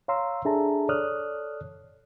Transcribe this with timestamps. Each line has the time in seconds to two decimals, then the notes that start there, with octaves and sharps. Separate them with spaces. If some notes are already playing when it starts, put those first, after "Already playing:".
0.08 C#5 F5 A#5 C6 E6
0.45 D4 G#4 A4 E5 A5 A#5
0.88 A4 C#5 D5 D#6 F6 F#6